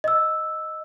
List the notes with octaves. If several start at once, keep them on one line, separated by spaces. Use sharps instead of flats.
D#5 E6